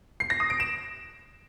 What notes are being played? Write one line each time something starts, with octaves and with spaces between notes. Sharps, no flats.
C7
A#6
D#6
D7
E7